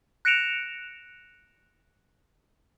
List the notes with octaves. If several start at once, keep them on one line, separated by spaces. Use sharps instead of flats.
F#6 A#6 C#7 D7 E7 F7